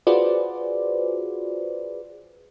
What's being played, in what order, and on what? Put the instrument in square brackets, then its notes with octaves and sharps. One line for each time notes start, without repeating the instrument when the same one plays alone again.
[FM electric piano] F4 F#4 G#4 B4 C5 D5